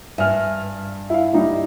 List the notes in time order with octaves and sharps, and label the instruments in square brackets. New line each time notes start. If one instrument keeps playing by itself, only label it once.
[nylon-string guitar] G2 [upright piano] E5 G#5 F6
[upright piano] E4 F5
G3 D#4 E4